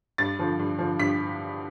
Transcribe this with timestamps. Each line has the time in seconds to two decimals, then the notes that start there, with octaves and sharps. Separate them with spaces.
0.18 G2 A6
0.39 D3 F3
0.59 G2
0.79 D3 F3
0.99 G2 B6